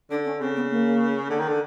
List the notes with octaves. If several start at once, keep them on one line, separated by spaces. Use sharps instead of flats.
D3 D4
C#4
C#3 C4
B3
A#3
D3
D#3
D3